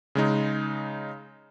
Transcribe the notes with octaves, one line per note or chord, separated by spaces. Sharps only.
C#3 G#3 D#4